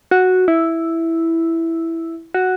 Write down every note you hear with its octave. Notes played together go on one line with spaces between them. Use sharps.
F#4
E4
F#4